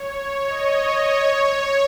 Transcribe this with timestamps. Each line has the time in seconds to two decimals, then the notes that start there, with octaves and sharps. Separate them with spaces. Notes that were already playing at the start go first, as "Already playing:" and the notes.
Already playing: C#5
0.11 C#5
0.44 D#5
0.77 D#5
1.10 C#5